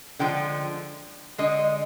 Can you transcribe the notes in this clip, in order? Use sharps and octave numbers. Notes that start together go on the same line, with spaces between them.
D3 F3 G#3 G5
D3 G#3 D#5